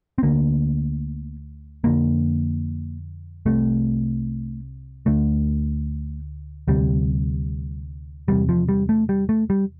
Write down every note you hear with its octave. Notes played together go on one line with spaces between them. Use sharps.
C4
D2 D3 A#3
F2 D3 A#3
C2 C3 A3
D2 D3 A3
D2 C3 G3
E2 C3 G3
F3
G3
A3
G3
A3
G3